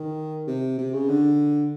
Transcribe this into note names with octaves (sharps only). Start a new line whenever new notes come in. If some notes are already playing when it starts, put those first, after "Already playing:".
Already playing: D#3
C3
C3
C#3
D3